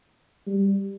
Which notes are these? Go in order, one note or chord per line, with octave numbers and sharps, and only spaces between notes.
G3